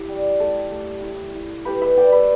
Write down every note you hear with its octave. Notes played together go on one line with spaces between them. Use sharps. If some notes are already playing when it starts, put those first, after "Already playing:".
Already playing: E4 G4
G3
A3 A4
A3
E4
E4
A3 G4 B4
B4 E5
A3 D5 G5
B4 E5